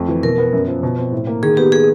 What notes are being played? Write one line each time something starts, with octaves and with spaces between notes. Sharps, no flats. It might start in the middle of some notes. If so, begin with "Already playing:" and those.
Already playing: F2 A3
E3
B2 A#4
B3
F#2
F3
B2
C4
A2
A#3
D#3 G#4
B3 G4
G#4